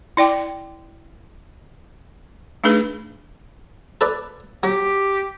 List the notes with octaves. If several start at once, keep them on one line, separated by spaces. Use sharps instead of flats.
E4 D5 G5 D6
A3 D4 D#4 G#4 B4
A4 B4 D5
F#3 G4